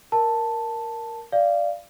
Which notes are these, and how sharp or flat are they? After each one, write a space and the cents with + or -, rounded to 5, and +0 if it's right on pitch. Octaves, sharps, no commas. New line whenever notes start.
A#4 +0 A5 +5
D5 +0 F5 -20